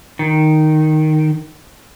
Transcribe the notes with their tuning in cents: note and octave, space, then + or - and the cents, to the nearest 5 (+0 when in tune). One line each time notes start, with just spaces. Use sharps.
D#3 -5